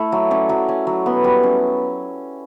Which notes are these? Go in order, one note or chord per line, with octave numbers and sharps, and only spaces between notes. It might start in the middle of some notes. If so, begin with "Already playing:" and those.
Already playing: A3 E4 A4
F#3
C#4 D5
F#3
C#4
F#3
B3
G3
C#4